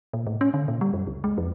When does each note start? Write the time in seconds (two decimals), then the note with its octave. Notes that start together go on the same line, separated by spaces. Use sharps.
0.13 A#2
0.27 A2
0.41 C#4
0.54 D3
0.68 A#2
0.81 G3
0.93 F#2
1.07 C#2
1.24 G#3
1.38 F2